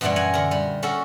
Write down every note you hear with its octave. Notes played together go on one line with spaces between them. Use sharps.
F#2 A#2 E3 G3 D4 F#5
F#5 G#5 A#5
D3 A#4
G3
C#4 F#4 A4 A#4